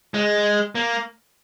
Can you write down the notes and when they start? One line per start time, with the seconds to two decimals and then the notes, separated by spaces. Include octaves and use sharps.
0.14 G#3
0.75 A#3